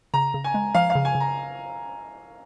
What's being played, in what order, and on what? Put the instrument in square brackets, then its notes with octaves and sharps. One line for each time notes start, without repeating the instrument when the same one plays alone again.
[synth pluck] C#3 [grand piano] A#5
[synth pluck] C#3
[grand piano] G#5
[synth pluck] G#3
[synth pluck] F3 [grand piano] F5
[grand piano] F5
[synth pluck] C#3
[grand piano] G#5
[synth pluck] C#3
[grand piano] A#5